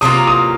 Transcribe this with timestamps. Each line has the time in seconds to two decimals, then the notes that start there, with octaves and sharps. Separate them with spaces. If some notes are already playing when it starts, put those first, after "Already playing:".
0.01 C3 F#3 A#3 F4 D#6
0.27 D#6